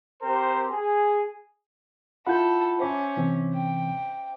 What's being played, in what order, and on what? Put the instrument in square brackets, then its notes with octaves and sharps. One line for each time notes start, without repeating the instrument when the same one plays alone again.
[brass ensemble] C4 G4 A#4 C5
G#4
[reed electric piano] E4 F4 F#5 [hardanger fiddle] A4 [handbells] B5 G6
[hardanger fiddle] C#4 [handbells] C5 E5 D6
[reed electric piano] C3 E3 C4
[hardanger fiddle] G5